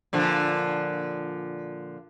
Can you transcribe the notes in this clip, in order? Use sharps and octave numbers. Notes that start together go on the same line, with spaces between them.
A#2 D3 F3